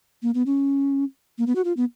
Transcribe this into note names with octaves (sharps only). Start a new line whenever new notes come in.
A#3
B3
C#4
A#3
B3
F#4
F4
B3